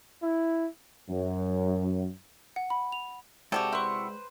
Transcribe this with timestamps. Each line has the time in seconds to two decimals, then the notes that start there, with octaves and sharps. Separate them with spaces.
0.22 E4
1.09 F#2
2.56 F#5
2.70 B5
2.92 F7
3.52 C3 G#3 F#4 G4 A4 D5 G5
3.72 E4 B4 C5 C#6